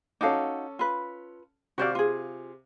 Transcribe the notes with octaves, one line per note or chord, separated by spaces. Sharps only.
C#4 D#4 F#4 A4 F5 D6
F4 B4
C3 F#4 C5 D5 F5
F4 G#4